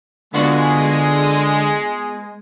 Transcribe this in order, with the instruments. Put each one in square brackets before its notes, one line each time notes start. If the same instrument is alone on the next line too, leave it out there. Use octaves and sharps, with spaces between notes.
[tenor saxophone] D3 [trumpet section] G#3 [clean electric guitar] B3 F4 F#4